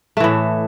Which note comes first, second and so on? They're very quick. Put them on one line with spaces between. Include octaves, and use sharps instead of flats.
A3 E3 A2